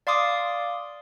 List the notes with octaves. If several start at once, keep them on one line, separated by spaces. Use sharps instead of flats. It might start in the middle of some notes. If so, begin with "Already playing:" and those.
D5 F5 C6 D6 D#6